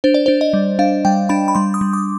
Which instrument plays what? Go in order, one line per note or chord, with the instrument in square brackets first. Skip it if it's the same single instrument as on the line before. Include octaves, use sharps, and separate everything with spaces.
[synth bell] D4 C5
D5
D4 C5
D#5
G3
D4 F5
G3 G5
D4 B5
B5
G3 C6
D#6
G3
D6